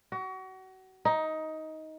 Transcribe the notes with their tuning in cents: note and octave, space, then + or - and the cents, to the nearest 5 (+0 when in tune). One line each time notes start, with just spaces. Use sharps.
F#4 +30
D#4 +15